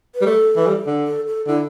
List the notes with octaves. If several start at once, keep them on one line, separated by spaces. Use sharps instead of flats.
B4
G3
A3 A4
E3
G3
D3
A4
A4
D3 E4